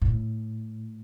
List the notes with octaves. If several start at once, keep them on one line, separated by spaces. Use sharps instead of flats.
A2